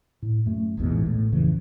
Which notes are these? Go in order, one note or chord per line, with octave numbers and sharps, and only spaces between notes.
A2
F#2 A3
A1 E2 G#2 B2
A2
D1 F2 C#3 E3